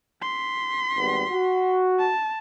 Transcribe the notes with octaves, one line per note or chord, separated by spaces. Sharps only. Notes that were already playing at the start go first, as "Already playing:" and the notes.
C6 B6
G#1 G3 B3
F#4
A5